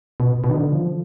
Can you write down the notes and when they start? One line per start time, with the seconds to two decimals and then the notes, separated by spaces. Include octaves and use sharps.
0.20 B2
0.44 B2
0.49 D#3
0.54 D3
0.72 F3